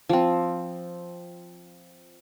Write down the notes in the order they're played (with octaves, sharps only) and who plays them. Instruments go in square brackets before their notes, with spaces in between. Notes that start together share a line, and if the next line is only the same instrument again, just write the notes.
[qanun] F3 C4